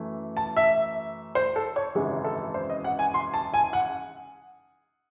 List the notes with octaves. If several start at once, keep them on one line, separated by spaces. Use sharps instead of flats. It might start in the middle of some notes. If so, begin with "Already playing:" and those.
Already playing: F#2 E3 A3
A5
E5
C5
A4
C#5
G#1 F#2 C#3 E3 G#3
A4
C5
D#5
F#5
G#5
C6
A5
G#5
F#5